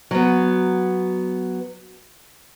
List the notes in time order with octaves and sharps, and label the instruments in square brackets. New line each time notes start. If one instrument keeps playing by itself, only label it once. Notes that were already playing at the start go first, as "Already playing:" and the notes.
[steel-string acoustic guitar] F#3 B3